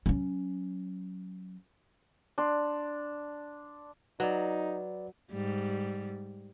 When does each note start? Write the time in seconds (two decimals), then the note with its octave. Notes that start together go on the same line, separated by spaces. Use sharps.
0.06 F#3 C#4
2.38 D4 C6
4.20 F#3 D#4 B4 D5
5.32 G#2 G3